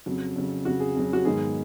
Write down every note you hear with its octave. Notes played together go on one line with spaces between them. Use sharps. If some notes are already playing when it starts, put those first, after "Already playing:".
F2 C#3 F#3
F2 C#3 F#3
F2 C#3 F#3 F#4
G#4
F2 C#3 F#3
F#4
G#2 D#3 F#3 B3 D#4 G#4